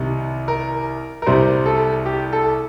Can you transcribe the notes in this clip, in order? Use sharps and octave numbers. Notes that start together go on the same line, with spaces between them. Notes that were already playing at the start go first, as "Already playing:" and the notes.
Already playing: C2 C3 D#3
A#4
A#4
C2 C3 G3 C5
A4
G4
A4